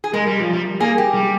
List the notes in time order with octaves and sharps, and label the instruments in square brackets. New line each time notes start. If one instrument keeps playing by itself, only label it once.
[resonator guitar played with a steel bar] G#4
[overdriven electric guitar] G#3 [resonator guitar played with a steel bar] A#4
[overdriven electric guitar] G3
F3
G3
[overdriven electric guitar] A#3 [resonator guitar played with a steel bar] G#4
[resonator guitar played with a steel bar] G4
[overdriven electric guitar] G3